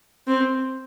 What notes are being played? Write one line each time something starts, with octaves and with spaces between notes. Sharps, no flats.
C4